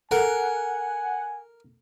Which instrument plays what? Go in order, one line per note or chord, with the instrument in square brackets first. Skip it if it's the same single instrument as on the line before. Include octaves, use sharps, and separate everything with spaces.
[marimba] A4 [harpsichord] A#4 [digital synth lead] F#5 [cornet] G#5